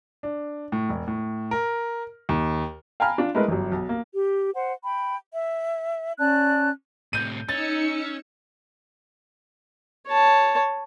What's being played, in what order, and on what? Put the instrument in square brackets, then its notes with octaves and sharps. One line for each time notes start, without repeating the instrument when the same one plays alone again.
[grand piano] D4
A2
E1
A2
A#4
D#2
[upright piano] F5 G5 G#5 A#5 B5 F6
D4 F4
G#3 A3 E4 A#4 B4 D#5
G1 F#2
B1
A#3
[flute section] G4
C5 F#5
G5 B5
E5
C#4 D5 A5 F#6
[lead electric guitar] A2 C3 [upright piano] G6 D#7
[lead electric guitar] C#4 [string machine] D#4 E6 C#7 [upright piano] A6
[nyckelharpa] C#5 A5